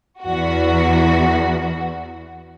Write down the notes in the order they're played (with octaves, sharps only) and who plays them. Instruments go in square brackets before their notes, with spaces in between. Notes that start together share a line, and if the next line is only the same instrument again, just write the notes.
[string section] E2 F#4